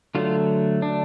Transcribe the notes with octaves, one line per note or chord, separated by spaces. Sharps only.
D3 F#3 A3 F4
D4